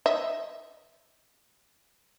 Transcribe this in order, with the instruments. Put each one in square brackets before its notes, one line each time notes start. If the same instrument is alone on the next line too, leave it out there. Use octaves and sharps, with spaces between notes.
[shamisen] D#5 E5